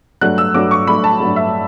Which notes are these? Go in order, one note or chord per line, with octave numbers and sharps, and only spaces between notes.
G2 F#3 A3 F#6
E6
G2 F#3 A3 D6
C#6
G2 F#3 A3 B5
A5
G2 F#3 A3
E5